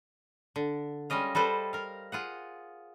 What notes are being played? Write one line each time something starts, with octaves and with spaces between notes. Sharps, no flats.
D3
G3 G#3 C#4 D#5 F5
G3 A4 B4 C5
A#4 F5
F4 G#4 F#5